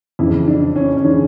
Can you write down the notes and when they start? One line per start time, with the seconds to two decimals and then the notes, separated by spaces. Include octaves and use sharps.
0.19 F2 C#3 E3 E4
0.48 D4
0.76 C#4
0.97 C#4
1.04 C#3 E3 D4